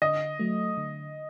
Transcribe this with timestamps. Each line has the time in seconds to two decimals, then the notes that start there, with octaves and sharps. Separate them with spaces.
0.02 D3 D#5
0.40 F#3 A3
0.77 D3